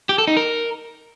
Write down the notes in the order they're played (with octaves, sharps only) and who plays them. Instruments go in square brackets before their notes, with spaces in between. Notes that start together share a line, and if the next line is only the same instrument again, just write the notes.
[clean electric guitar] G4
A4
D#4
A#4